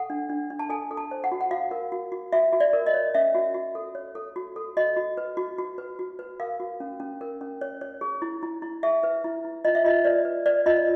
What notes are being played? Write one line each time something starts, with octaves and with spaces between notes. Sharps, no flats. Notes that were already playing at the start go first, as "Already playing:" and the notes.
Already playing: A4 F#5
D4
D4
D4
A5
A4 G#5
A4
A5
C5
F#5
F#4
F#5
F#4 F5
A#4
F#4
F#4
F#4 E5
F#4
D5
A#4
D#5
C#5
C#4 E5
F#4
F#4
A4
C#5
A4
F#4
A4
F#4 D#5
F#4
B4
F#4
F#4
B4
F#4
B4
A#4 F5
F#4
C#4
C#4
A#4
C#4
C#5
C#5
G#4
E4
E4
E4
G#4 E5
B4
E4
E4
F4 D#5
E5
F4 D#5
B4 D5
B4
B4 D5
F4 D#5